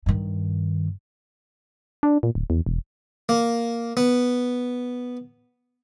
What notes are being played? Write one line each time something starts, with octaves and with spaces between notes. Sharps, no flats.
G2 D#3
D4
A#2
D1
E2
E1
A#3
B3